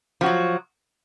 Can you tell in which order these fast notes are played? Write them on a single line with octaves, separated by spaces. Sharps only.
F3 F#4 F#3